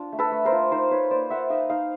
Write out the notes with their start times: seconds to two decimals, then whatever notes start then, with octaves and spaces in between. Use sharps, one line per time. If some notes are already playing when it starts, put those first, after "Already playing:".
Already playing: D4 F4
0.12 A3
0.19 A4 B4
0.32 A3
0.45 A#4 C5
0.52 F4
0.71 D#4 A#4 C5
0.91 D#4 B4 C#5
1.11 A#3 C5 D5
1.30 A#3 E5 F#5
1.50 D#4 D#5 F5
1.69 D#4 D#5 F5